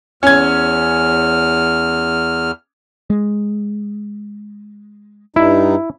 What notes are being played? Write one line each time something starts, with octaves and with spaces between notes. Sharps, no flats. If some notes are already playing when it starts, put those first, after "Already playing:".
E2 C#4 F6 G#6
G#3
G2 G3 D#4 E4